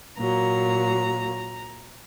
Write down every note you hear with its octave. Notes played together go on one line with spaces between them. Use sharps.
A#2 F#3 A#3 A#5